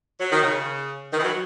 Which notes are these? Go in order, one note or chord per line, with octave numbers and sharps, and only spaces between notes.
F#3
D#3
C#3
D#3
E3
F#3